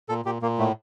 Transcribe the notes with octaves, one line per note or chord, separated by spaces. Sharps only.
A#2 A4
A#2 G4
A#2 A#3
A2 A3